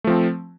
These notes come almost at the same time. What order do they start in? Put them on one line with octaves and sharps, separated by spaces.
A3 F3 C4